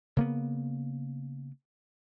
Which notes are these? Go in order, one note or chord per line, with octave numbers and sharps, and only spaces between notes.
C#3 A#3 B3